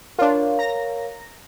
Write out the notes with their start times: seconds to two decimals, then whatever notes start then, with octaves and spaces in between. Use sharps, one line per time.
0.19 D4 F4 A#4 C#5 F5
0.59 A#5 A#6